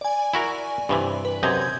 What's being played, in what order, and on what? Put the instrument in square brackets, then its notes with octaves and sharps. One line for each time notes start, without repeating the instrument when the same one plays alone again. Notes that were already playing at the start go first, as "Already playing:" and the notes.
[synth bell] D5 G#5
[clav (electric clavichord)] E4 F#4 A#4
G2 C3 E3
[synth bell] B4
[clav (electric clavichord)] F#2 C3 D#5 [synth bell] G6 G#6